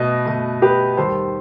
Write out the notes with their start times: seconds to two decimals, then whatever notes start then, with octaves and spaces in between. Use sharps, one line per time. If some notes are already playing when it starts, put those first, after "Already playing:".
Already playing: B2 A3 B4 D#5
0.26 B2 A3
0.62 G4 B4
0.97 D#2 D#3 G3 A4 C5